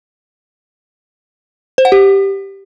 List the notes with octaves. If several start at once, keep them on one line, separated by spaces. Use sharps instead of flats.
C5
F#5
G4